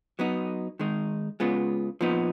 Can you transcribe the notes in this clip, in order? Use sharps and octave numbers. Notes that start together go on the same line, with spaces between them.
F#3 B3 D#4
D#3 G#3 D#4
C#3 G#3 B3 F4
A#2 F3 B3 D#4